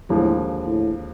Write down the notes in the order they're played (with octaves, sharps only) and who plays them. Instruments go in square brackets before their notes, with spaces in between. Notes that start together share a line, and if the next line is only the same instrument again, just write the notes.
[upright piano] D#2 D3 F3 G#3 [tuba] A2
[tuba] A2